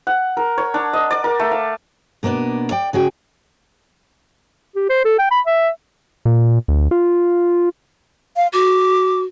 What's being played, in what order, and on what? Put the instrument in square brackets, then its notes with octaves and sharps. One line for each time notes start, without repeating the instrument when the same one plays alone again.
[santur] F#5
A#4
C#5
D4
D#5
D5
A#4
A3
F5
[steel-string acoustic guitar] B2 A#3 B3 C#4 D4
D5 G5
C#3 F#4 G#4 G5
[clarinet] G4
C5
A4
G5
B5
E5
[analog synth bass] A#2
D2
F4
[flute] F5
[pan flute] F#4 [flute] D6